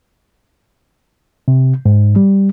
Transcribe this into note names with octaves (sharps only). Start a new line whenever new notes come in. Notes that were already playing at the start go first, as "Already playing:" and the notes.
C3
G#2
G3